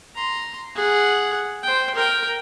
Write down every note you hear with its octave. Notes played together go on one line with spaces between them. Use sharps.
A#5 C6
G#4 F#5
C5 G5
A#4 G5